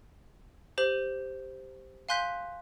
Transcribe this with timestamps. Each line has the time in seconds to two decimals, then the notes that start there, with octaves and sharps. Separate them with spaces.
0.78 G4 C5 F#7
2.09 F5 G#5 C6 F#6 G6 B6